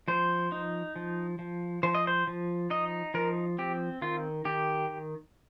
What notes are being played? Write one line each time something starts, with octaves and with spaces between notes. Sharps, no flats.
F3 C5
D#4
F3
F3
F3 C5
D#5
C5
F3
D#4 D#5
F3 A#4
C4 G4
D#3 F4
D#3 G4